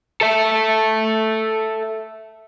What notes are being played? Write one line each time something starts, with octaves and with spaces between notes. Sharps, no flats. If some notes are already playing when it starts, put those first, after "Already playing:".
A4 E5